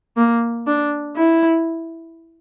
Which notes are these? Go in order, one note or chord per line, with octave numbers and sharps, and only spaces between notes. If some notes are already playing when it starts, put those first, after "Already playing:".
A#3
D4
E4